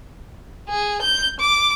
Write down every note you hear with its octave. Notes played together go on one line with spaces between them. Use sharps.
G#4
G6
D6